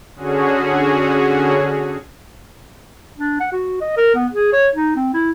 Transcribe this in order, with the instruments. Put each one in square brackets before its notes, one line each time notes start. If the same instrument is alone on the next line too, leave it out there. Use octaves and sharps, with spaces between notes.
[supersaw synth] D3 C#4 F#4 G#4
[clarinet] D4
F#5
F#4
D#5
A#4
B3
G#4
C#5
D#4
C4
E4